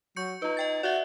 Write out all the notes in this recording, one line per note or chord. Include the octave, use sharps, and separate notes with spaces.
F#3 C#6 G6 C#7
D#4 F4 B4
D#5 G5 A6
F#4 D5 E5